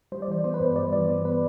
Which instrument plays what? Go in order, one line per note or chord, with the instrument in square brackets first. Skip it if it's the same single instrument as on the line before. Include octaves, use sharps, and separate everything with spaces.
[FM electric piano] G3 C5
D5
E3 C5
B3 C5
B4
G2 C5
G3 D5
E3 D5
B3
B4